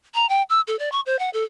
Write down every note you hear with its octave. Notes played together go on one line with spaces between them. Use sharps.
A#5
G5
E6
A4
D5
C#6
C5
F#5
A4